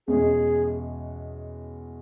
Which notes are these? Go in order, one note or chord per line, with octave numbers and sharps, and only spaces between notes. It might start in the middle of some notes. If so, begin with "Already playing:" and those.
E2 B2 G#3 C#4 G#4